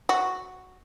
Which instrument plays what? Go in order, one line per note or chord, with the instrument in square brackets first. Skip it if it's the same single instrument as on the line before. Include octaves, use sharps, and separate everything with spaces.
[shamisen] F#4